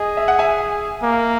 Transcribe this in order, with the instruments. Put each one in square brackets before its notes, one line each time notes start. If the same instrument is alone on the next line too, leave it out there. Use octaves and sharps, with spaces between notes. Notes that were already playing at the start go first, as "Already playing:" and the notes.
Already playing: [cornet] G#4 [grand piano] D#5
[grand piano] E5
F#5
E5 G#5
[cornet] A#3